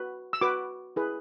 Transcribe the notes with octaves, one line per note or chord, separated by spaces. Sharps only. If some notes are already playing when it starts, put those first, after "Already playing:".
Already playing: F#4 B4
E6
F#4 B4 D6
E4 G#4 B4